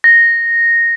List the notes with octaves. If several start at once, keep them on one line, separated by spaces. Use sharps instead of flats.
A#6